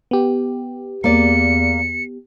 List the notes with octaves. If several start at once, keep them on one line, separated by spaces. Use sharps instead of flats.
B3 G4
E2 A#3 D5 C#7